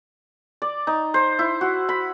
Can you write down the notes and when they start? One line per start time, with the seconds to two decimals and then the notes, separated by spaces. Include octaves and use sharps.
0.62 D5
0.87 D#4
1.14 C5
1.39 E4
1.61 F#4
1.89 B5